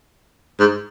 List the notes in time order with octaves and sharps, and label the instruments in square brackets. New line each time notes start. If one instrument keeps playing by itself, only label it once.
[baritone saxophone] G#2